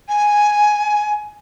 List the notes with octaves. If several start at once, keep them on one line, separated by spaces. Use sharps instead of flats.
G#5